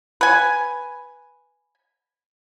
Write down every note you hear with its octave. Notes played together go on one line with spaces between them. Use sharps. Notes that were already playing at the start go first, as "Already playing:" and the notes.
B4 G#5